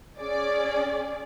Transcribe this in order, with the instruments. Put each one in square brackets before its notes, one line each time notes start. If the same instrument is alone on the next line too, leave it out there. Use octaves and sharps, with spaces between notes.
[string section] C#4 G#4 D5